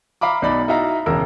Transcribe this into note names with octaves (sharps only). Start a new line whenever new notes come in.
E5 F5 A#5 B5 D6
B1 D#4 D5 B5
D#4 E4 F#4 E5 F5 A#5
E1 C#2 A#4 A#5 E6